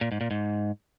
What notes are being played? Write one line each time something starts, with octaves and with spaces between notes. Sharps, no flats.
A#2
G#2
A#2
G#2